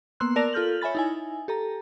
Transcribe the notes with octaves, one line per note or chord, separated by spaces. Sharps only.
A#3 B3 C6 E6 F#6
A#4 D5 A5 A#6 F7
F4 A4 F6 G6 F#7
C#5 E5 G#5 B5 A6
D#4 E4 G#5
G4 A4 A#5